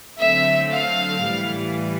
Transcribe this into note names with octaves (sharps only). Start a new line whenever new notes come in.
D3 F#3 A3 C4 E5
F5
A2 E3 G3